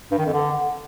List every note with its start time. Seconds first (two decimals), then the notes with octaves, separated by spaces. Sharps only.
0.11 G2
0.19 D#3
0.26 F2
0.33 D3